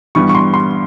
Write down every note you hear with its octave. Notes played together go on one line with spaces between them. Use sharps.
G2 E3 G3 B3 C#6
C#6
C6
C6